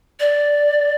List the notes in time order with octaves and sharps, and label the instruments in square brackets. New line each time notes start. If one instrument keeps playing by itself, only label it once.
[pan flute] D5